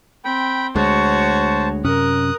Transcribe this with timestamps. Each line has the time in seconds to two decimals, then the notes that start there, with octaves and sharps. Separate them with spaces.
0.25 C4 G5 B5
0.76 D2 G#3 F#4 C5 C#5 A5
1.85 F#2 C3 C#4 A#4 D#6 F#6